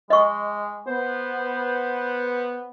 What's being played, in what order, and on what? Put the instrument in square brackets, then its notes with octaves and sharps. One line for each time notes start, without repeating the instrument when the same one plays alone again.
[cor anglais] G#3 [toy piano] D#5 C#6
[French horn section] B3 [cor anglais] C5